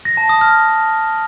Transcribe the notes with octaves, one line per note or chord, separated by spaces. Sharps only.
A#6
A5
D#6
F6